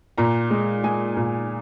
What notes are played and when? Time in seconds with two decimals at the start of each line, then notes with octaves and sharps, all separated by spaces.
0.18 A#2 A#5
0.51 G#3
0.84 G#3 G#5
1.17 A#2